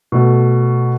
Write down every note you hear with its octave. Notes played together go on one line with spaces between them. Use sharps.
B2 A3